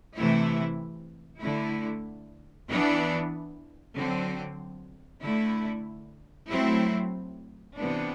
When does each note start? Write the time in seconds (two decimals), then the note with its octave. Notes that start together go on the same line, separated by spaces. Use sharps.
0.15 C3 E3 A3 E4
1.41 D3 A3 E4
2.68 E3 B3 D4
3.96 D3 F#3 C4
5.22 D3 A3 E4
6.49 F#3 A3 C4 E4
7.76 C3 E3 B3 D4